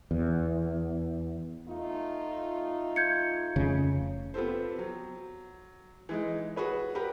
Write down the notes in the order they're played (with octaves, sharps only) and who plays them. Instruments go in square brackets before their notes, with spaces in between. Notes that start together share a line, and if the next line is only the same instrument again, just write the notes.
[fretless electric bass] E2
[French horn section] A3 D#4 F4
[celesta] G6 G#6 C#7
[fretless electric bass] F1 C#3
[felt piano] B3 C4 F4 G4 A4 C5
F#3
E3 G#3 D#4
F#4 G#4 B4 C#5
G4 A#4 B4 F#5